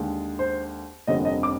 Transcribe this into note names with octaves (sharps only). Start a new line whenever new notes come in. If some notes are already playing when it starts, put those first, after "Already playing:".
Already playing: D#2 D3 G#3
C5
F1 F2 D3 G3 A#3 D#5
D#5
D6